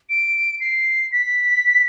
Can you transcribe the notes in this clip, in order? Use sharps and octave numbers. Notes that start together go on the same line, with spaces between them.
D7
C7
B6